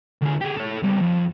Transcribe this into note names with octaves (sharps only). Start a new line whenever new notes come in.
D2 G#4
G4 G#4
A4 C#5
C#2 G3
F2